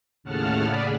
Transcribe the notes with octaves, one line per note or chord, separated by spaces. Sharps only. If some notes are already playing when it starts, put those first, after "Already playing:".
D#2 A2 C#3 F#5 A5 F6
G#4 D5 B5